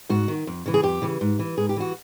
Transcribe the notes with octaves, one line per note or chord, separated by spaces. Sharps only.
G#2 F#4
D#3
F2
C#3 E3
G#4
F2 G4
C#3 E3
G#2
E3
G#2 G#4
G4
E3 F#4